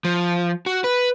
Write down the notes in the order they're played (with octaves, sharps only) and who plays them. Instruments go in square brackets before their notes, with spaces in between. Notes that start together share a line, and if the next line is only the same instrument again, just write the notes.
[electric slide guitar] F3
F#4
B4